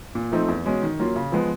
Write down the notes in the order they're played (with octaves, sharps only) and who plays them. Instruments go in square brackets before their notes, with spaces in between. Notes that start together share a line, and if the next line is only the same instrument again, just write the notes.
[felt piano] A#2
F3 A3 C4 D#4
E2
B2 G#3 C#4
D#3
F#3 A#3 C#4 F4
C#3
F3 G#3 B3